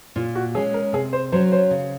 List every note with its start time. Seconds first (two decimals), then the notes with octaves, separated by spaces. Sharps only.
0.16 A#2 F4
0.35 F#4
0.55 G#3 C#4 G#4
0.74 A#4
0.93 C3 G#4
1.13 C5
1.32 F#3 C#4 C5
1.52 C5
1.71 C#3